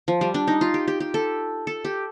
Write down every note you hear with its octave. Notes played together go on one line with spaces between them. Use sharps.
F3
G3
D4
D#4
F4
G4
G4
G4
A4
A4
G4